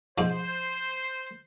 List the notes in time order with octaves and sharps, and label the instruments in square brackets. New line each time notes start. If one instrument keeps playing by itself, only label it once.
[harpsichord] G#2 F3 [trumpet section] C5